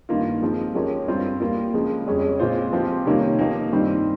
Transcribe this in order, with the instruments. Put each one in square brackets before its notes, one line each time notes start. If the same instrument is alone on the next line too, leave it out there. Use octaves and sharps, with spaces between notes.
[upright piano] G2 D#3 A#3 F4
F3 G#3 C4
F3 G#3 C#4 G4 A#4
G2 G3 C4 F4 C5
G3 A#3 F4
C#3 F3 G#3
F2 C#3 G3 C#4 G#4
A#2 G#3 C4 F4 C5
F3 C4 G4
C3 D#3 G3 A#3 C#4
F3 A#3 D#4 G4 A#4
G2 D#3 G3 C4